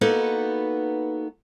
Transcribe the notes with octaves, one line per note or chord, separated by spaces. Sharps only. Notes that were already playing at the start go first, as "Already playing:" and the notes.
A#3 B3 D#4 F#4 A4 B4